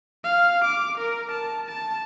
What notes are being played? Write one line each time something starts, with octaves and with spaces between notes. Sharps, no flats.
F5
D6
A#4
A5
A5